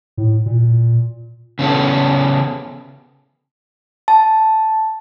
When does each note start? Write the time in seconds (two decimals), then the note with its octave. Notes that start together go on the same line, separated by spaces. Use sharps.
0.17 A2
0.46 A#2
1.59 C#3 B3 C#4 A4
4.08 A5